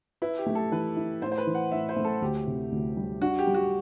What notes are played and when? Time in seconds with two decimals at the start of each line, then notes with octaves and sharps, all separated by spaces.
0.22 E4 B4
0.38 G4
0.46 A3
0.55 A4
0.72 E3 B4
0.97 E4
1.21 A2 C5
1.32 C5
1.38 B4
1.47 E3
1.55 F#5
1.72 A2 E5
1.89 C5
1.96 A3
2.04 A4
2.22 D2 G4
2.47 C3
2.72 D2
2.97 G3
3.21 D4 F#4
3.39 G4
3.47 G3
3.54 F#4